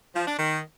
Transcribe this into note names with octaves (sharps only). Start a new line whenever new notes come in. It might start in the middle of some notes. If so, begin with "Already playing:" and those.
F3
D4
D#3